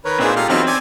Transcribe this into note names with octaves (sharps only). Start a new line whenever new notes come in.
D#3 A#4 B4 C#5 B5
A#2 C4 D4 D#4 G#4 C5 E5
G#3 F4 G4 A4 F5 A#5
E2 F#3 B3 C4 D#4 D#5 F6
C#4 D5 G#5